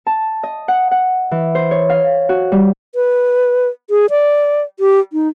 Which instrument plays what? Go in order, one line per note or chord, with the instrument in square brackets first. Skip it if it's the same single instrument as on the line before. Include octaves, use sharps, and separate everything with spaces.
[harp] A5
D#5
F#5
F#5
E3
C5
C#5
F5
F#4
G3
[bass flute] B4
G#4
D5
G4
D#4